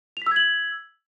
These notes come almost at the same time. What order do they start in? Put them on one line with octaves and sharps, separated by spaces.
F7 B6 E6 G#6 F#7